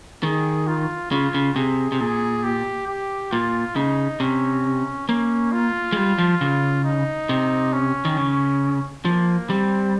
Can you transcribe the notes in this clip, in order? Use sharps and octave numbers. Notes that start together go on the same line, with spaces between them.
D#3 G#4
F4
C#3 F4
C#3
C3 G#4
C3
A#2 G#4
G4
G4
A#2 F4
C#3 D#4
C3 C#4
A#3 C#4
F4
G#3
G3
F3
C#3
D#4
C3
C#4
D#3
C#3
F3 A#3
G3 C4